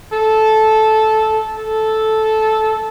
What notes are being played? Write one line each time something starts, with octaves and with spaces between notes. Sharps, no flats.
A4
A4